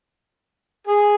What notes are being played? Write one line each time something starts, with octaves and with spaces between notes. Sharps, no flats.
G#4